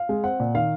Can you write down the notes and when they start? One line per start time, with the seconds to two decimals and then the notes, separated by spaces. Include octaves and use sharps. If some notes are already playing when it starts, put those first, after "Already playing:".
Already playing: F5
0.09 G#3
0.24 C4 F#5
0.40 A#2
0.54 D#3 F5